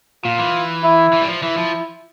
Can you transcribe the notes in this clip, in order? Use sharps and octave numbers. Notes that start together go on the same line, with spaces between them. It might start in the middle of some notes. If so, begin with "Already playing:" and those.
A#2 F4
E3
E4
E3
G3
F3
E3 E4
F3